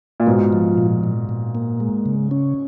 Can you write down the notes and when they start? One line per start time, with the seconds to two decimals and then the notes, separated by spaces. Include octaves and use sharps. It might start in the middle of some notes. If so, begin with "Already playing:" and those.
0.20 A#2
0.27 G#2 B2 F4
0.53 F3
0.78 A#2
1.03 A#2
1.29 A#2
1.55 A#3
1.80 G#3
2.06 C#3
2.31 C#4